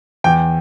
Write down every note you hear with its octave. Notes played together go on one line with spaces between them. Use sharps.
E2 G5